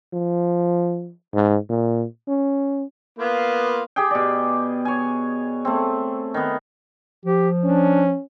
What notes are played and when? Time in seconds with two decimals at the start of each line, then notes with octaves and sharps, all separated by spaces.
0.13 F3
1.34 G#2
1.69 A#2
2.28 C#4
3.19 A#3 B3 F4
3.96 G4 G#4 G5
4.11 B2 D5
4.85 C#5 G#5
5.65 A3 C4
6.34 D#3 B3
7.26 F3 G4
7.64 C#4 D4